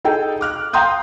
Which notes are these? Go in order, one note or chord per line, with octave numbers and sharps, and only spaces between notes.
D#4 G#4 A4 G5
D6 F6 F#6
F5 G5 A#5 C6 D#6 G6